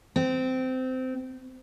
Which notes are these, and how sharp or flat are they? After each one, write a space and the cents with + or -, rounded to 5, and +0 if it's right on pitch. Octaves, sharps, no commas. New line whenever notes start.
C4 -20